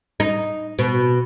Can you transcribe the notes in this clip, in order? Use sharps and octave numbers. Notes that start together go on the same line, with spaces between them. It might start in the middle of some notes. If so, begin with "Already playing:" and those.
D#4
B2